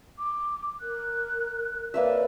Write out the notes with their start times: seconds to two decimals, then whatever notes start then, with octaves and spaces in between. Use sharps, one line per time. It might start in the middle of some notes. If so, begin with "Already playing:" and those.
0.19 D6
0.80 A#4 F#6
1.94 A#3 B4 C#5 D5 E5